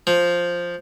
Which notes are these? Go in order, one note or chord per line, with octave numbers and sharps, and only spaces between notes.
F3